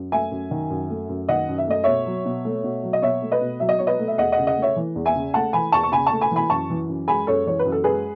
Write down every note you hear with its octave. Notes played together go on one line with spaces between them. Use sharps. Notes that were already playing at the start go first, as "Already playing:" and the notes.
Already playing: F#2
A3 E5 G#5
F#2
D#3
F#2
A3
F#2
D#3 D#5 F#5
F#2
E5
A3 D#5
B2 C#5 E5
F#3
B2
A3
B2
F#3
D#5
B2 C#5 E5
A3
B4 D#5
B2
F#3 E5
D#5
B2 C#5
B4 D#5
A3
E5
E2 D#5 F#5
D#5 F#5
C#3
D#5 F#5
A3
C#5 E5
E3
E2
E5 G#5
C#3
A3 F#5 A5
E3 G#5 B5
E2 A5 C#6
C#6
C#3 G#5 B5
A5 C#6
A3
G#5 B5
E3 G#5 B5
F#2 A5 C#6
E3
F#2
G#3 G#5 B5
F#2 A4 C#5
E3 C#5
B4
F#2
A4
G#3 G#4 B4